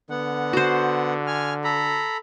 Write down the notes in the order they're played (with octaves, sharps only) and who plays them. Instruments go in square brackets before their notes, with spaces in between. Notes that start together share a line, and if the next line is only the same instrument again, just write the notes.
[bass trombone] D3 [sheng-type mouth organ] B3 F#5
[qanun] F#4 C5
[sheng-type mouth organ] G#5 F6
A4 A#5 B5